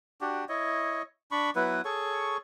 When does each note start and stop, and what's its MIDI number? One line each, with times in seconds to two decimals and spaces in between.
0.21 0.45 62
0.21 0.45 66
0.21 0.45 67
0.49 1.02 64
0.49 1.02 73
0.49 1.02 75
1.31 1.50 62
1.31 1.50 83
1.31 1.50 85
1.56 1.81 54
1.56 1.81 59
1.56 1.81 64
1.56 1.81 71
1.85 2.37 68
1.85 2.37 69
1.85 2.37 73
1.85 2.37 85